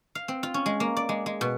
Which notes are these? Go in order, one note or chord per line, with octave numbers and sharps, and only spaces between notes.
F5
C4
F4
C#4
G#3
A#3
D5
G#3
G#3
B2